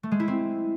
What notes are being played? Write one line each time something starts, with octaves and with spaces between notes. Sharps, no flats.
A3
G#3
E4
C4